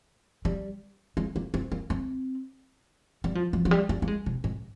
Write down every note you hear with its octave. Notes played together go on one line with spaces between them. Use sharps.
G3
G#3
A#3
C4
A#3
C4
G3
F3
F3
F3
G3
G3
A#3
G#3
C3
G#2